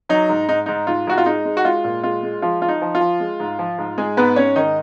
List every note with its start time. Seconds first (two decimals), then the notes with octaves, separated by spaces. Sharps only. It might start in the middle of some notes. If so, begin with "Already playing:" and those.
0.09 F#3 D#4
0.29 G#2
0.49 G#2 D#4
0.66 G#2 D#4
0.87 G#2 F4
1.07 G#2 F#4
1.18 F4
1.26 G#3 D#4
1.45 G#3
1.57 F#4
1.65 G#3 F4
1.84 A#2
2.03 G#3 F4
2.23 G#3
2.42 F3 F4
2.62 F3 F4
2.68 D#4
2.82 F3
2.95 F4
3.01 F3
3.20 G#3
3.40 G#2
3.59 F3
3.78 G#2
3.98 G#2 G#3 G#4
4.17 G#2 B3 B4
4.36 G#2 C#4 C#5
4.56 D#3 D#4 D#5